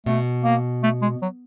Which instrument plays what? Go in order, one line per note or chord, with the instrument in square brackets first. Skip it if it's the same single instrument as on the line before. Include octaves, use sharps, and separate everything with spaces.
[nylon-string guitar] B2 [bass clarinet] A3
[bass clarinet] A#3
A3
G#3
F#3